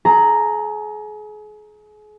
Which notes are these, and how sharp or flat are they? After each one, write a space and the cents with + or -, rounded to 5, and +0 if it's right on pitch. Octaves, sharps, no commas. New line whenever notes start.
G#4 +35 A#5 +0